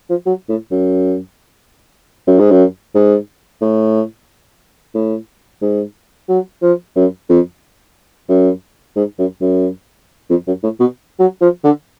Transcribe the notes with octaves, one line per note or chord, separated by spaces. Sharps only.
F3
F#3
A2
F#2
F#2
G#2
F#2
G#2
A2
A2
G#2
F#3
F3
F#2
F2
F#2
G#2
F#2
F#2
F2
F#2
A2
B2
F#3
F3
D3